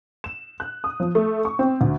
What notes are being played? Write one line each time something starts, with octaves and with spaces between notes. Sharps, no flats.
E7
F#6
D#6
F3
A3
C#6
C4
D2